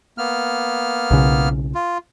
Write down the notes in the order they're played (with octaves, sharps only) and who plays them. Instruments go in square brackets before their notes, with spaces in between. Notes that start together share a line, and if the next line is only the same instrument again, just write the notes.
[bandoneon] A#3 B3 F6
[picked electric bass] B1 C#3
[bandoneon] F4